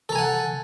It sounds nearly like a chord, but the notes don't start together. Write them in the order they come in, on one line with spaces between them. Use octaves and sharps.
A4 A#5 G#5 F#5